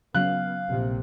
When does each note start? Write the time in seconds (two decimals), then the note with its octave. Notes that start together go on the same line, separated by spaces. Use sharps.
0.14 C#3 F#3 B3 F5 F#6
0.68 A#1 C3